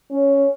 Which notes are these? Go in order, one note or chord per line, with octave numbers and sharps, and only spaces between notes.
C#4